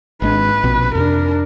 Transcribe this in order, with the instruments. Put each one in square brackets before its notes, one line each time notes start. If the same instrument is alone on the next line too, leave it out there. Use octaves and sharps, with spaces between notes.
[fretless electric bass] G#1 G#3 D4 [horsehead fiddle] B4
[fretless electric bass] A#1 B2 C4
[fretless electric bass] F2 C3 [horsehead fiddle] D4 A#4